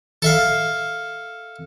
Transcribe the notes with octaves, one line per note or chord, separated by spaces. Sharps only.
A4 E5 F5